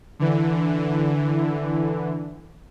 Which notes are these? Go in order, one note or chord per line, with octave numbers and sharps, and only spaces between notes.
D3 E3